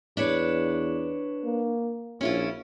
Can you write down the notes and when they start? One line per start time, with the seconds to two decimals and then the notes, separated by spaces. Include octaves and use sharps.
0.17 E2 D4 B4 C#5
1.44 A#3
2.21 A#1 C#4 E4 F4